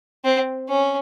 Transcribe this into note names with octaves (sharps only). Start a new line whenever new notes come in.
C4
C#4